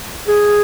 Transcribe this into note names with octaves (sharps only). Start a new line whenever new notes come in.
G#4